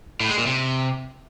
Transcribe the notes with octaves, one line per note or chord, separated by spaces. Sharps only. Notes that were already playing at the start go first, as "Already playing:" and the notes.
A2
G#3
A#2
C3